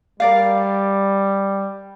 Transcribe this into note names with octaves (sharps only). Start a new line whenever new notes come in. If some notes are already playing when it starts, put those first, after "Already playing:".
G3 A#4 D5 F5